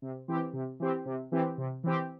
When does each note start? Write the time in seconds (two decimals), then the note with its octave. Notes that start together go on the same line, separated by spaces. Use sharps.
0.02 C3
0.28 E3 C4 G4
0.53 C3
0.80 E3 C4 G4
1.05 C3
1.32 E3 C4 G4
1.58 C3
1.84 E3 C4 G4